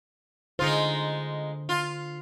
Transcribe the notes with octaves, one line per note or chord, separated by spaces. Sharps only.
D3 G#3 D#4 F4 C5
F4